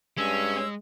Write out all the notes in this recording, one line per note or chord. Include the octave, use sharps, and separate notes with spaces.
G2 G#3 C#4 E6